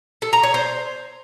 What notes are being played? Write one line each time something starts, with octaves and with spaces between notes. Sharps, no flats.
A4
A#5
C#5
C5